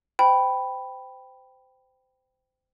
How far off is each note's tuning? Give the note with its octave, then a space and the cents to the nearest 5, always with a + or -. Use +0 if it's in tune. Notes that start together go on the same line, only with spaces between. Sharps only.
C5 -25 G5 +0 B5 +0